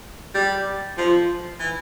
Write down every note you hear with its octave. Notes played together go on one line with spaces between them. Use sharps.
G3
F3
E3